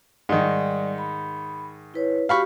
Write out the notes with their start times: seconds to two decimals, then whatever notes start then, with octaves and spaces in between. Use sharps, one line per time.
0.29 G#2 D#3 G3 D5
0.98 B5
1.94 E4 B4 C#5
2.29 F#4 G4 F5 B5 C#6